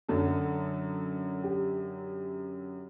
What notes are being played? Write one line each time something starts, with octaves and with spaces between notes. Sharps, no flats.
F#2 D3 F#3 A4
G4